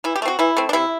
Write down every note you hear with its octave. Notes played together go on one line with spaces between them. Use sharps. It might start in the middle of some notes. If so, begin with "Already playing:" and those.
E3 E4
G4
A3
C4 F#4
E3 E4
A3 C4
D4
C3 E4